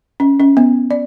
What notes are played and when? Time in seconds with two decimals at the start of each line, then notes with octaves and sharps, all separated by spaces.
0.20 C#4
0.40 C#4
0.57 B3
0.91 D5